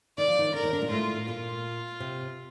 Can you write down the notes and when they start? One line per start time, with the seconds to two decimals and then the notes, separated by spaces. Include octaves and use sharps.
0.17 D#3 D5
0.27 F3
0.38 D#2 D#3
0.54 D3 A#4
0.63 D#2 D#3
0.73 D3 D4
0.82 A#2 A#3
0.90 A2 A3 F4
1.27 A#2 A#3 F4
2.00 C3 C4